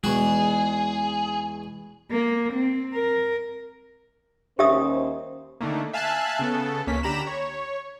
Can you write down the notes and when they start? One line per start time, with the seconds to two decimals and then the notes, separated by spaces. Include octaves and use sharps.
0.04 E2 G#3 F#4 G#4
2.11 A#3
2.53 C4
2.94 A#4
4.59 D#2 C#4 G4 C5 E5 D#6
5.60 D3 D#3 A3 A#3
5.93 E5 F5 G#5 A5 E6 F#6
6.39 C#3 B3 A4
6.87 C#2 A#3 C#4 B6
7.03 D3 G4 A#5 B5 E7
7.27 C#5